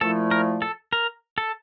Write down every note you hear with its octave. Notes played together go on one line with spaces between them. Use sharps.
A#2 F3 A3 E4 A4
A#4
A4
A#4
A4